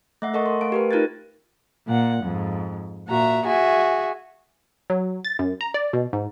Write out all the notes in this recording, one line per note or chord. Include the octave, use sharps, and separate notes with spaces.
A3 E5 F#5
A4 A#4 D#5 F#5 A5 C#6
A#4 C6
A3 F5 A5 D7
G4 A#4 B4
D#4 F4 A#4 F#6 G#6 A6
A#2 F#5
F2 G#2
A#2 F#4 E5 A#5
F#4 G#4 E5 G#5
F#3
A6
F#2
A#5
D5
B2
G#2